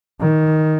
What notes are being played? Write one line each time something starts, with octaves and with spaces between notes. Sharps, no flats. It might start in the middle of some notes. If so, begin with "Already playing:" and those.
D#3